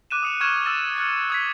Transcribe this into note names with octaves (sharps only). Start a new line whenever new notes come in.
D6 F#6 D#7 E7
D#6 C#7 E7
C#6 F6 G#6 E7
E6 F6 A6
F6 F#6 C#7
D#6 G#6 B6